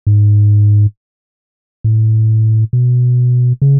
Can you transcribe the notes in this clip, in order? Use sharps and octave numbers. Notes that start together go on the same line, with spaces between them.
G#2
A2
B2
C#3